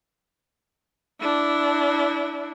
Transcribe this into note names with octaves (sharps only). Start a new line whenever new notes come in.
D4 E4